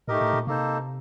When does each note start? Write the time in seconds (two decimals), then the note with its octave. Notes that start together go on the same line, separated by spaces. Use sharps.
0.08 A2 A3 D#4 G4 A#4 D#5
0.21 A2
0.33 A#2
0.46 C3 A#3 D#4 A4 C5